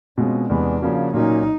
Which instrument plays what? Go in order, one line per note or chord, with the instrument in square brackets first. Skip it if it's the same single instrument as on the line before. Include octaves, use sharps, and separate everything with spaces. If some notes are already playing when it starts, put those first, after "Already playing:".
[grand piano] B2 G#3 C4 F4 [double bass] C#4
[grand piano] E2 C3 E3 G#3 B3 [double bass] D4
[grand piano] C#3 F3 A#3 C#4 F#4
[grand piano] A#2 F#3 A#3 C#4 [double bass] D#4